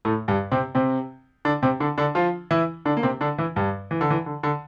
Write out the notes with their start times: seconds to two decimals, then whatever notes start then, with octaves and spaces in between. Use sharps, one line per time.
0.05 A2 A3
0.28 G2 G3
0.51 C3 C4
0.75 C3 C4
1.45 D3 D4
1.62 C3 C4
1.80 D3 D4
1.98 D3 D4
2.15 F3 F4
2.51 E3 E4
2.85 D3 D4
2.97 A#3
3.03 C3 C4
3.21 D3 D4
3.38 E3 E4
3.56 G2 G3
3.91 E3
4.01 D3
4.10 E3
4.26 D3
4.43 D3